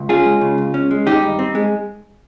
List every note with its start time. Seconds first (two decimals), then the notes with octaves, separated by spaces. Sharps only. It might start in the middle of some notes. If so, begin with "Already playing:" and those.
Already playing: C#2
0.09 C#4 F4 G#4
0.26 G#3
0.41 C#3
0.58 C#2
0.74 C#4
0.91 G#3
1.06 D#3 D#4 G4
1.23 G2
1.39 C4
1.55 G#3